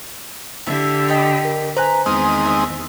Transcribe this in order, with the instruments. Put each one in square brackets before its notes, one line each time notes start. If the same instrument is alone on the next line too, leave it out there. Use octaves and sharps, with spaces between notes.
[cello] D3 G4 [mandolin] E4 E5
[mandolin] D5 D#5 G5
[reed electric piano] A#4
[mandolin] B4 A#5 [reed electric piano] C5 G#5
[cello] E2 D#3 [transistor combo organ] G#3 C4 D#4 [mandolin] F6
[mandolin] E5